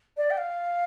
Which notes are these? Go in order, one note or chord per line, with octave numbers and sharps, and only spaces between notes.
D5
G5
F5